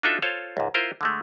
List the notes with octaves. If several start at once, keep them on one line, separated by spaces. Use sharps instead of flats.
D4 D#4 F4 F#4 A4 E5
F4 A4 C5 C#5 F5
C#2 G#2
E4 F4 A#4 C5
D3 G#3 A3